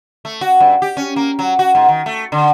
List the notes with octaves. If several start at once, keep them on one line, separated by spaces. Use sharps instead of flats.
A3
F#4
G2
G4
C#4
A#3
F#3
F#4
G#2
D#3
A3
D3